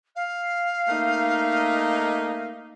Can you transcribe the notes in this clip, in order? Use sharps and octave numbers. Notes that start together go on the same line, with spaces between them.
F5
A3 A#3 D#4